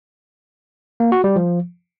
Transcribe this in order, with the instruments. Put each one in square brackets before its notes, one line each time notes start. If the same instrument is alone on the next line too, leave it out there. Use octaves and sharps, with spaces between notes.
[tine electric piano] A#3
F#4
G3
F3